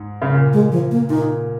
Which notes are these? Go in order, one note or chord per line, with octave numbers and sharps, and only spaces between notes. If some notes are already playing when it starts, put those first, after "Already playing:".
Already playing: G#2
C#3
A#2
G#3
F3
A#3
A#2 D#4